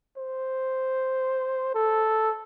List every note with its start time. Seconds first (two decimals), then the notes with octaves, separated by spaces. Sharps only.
0.17 C5
1.75 A4